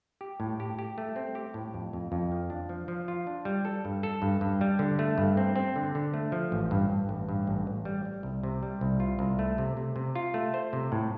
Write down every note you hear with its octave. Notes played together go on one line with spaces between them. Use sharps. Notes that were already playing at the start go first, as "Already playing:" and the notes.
G4
A2
G4
G4
A3
C4
G4
A2
F2
F2
F2
F3
D4
F3
F3
F4
D4
G3
A4
G2
A4
G2
G2
G3
D3
A3
G2
C4
C4
D3
D3
A3
F3
A1
G2
G2
A1
G2
A1
A1
G3
G3
C2
C3
G3
C2
F4
C2
A3
C3
C3
C3
F4
A3
C5
C3
A2